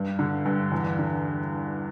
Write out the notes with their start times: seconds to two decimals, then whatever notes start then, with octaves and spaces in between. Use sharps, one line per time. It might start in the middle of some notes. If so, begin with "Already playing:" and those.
Already playing: G2
0.19 D3
0.46 G2
0.72 E2
0.99 D3